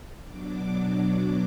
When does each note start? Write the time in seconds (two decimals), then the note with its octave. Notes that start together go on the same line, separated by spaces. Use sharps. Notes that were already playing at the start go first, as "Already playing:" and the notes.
0.22 B2 F#3 D4 D6
0.78 D6